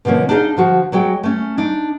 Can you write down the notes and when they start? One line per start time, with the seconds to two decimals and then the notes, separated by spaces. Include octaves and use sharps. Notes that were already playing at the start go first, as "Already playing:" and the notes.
0.05 B2 D3 F3 A#3 C#4
0.29 D4 D#4 G#4 D5 D#5 F5
0.57 D3 F3 F#4
0.92 F#3 G#3 F#4 G5
1.23 A3 C#4
1.57 D4 D#4